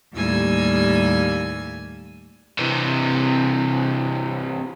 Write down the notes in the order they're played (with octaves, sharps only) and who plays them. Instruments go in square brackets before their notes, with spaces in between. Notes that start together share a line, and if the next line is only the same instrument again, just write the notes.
[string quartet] D#2 A2 G3 A#3 G#5 E6
[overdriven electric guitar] C3 E3